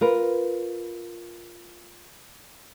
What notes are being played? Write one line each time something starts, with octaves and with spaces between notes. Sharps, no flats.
F4 A#4 B4